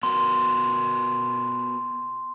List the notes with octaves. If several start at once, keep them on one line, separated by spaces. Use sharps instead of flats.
B3 F#4 A#4 C6